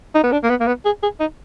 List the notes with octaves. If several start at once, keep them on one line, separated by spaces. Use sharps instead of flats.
D#4
B3
D4
A#3
B3
A#3
B3
G#4
G#4
D#4